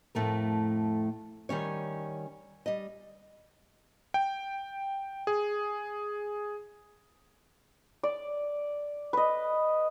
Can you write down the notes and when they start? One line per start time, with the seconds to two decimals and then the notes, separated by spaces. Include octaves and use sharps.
0.15 F2 A2 A3 A#4
1.49 D#3 G3 C#4 C#5
2.66 G3 D#5
4.14 G5
5.27 G#4
8.03 D5
9.13 B4 D#5